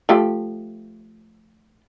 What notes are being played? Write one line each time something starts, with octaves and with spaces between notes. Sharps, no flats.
F3 A3 G4